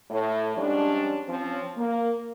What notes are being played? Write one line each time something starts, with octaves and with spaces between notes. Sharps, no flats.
A2
G#2 F3 G3 C#4 D4
F3 C4 C#4
A#3